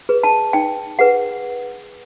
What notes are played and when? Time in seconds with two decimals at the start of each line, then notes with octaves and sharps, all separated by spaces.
0.09 G#4 B4
0.23 A5
0.53 D#4 G5
0.99 G#4 B4 F#5